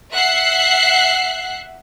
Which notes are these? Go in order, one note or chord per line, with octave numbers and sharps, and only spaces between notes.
E5 F#5 F#6 C7